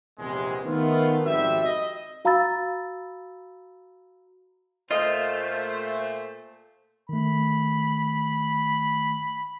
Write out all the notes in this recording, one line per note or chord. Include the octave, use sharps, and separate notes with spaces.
A#1 E2 C3 G#3
D#3 A3 B3 F4
G#1 F2 G3 C4 F#4 E5
D#5
F#4 F5 A#5 B5 E6 A6
A#2 A3 F4 C5 D#5
D#3 A3 B5